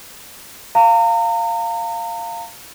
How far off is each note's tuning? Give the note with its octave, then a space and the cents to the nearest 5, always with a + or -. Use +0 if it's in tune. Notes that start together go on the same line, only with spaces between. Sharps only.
F5 -10 A#5 -35